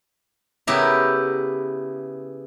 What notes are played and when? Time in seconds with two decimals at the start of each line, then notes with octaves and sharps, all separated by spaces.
0.67 C#3 B3 E4 G4 A#4